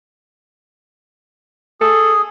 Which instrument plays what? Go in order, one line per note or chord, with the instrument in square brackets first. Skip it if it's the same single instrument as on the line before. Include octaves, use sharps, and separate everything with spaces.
[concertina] G#4 [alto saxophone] A4